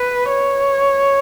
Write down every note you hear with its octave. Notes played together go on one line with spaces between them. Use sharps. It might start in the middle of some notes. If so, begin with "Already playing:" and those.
Already playing: B4
C#5